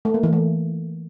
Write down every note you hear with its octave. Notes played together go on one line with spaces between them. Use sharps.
A3
A#3
E3
A3